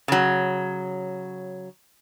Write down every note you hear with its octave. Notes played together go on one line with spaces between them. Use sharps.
C#3 F#3